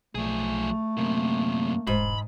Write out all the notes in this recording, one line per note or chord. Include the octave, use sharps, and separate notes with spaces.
B1 F3 A3 G#4
F#2 C3 A#3
E1 G#2 B5